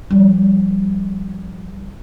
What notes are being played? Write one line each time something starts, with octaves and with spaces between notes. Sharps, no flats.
F3 G3